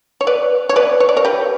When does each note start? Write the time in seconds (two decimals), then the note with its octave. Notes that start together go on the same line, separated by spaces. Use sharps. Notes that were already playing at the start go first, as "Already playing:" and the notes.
0.21 C#5
0.27 B4 D5
0.69 C#5
0.76 B4 D5
1.00 C#5
1.09 D5
1.17 A#4 C#5
1.25 G4 B4